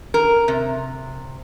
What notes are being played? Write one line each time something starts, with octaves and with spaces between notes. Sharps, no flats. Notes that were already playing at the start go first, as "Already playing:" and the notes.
A#4
C3